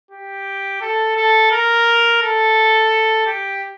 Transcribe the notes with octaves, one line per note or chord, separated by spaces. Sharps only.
G4
A4
A4
A#4
A4
G4